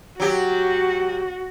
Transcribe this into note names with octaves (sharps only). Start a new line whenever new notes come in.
F#3 F#4 G4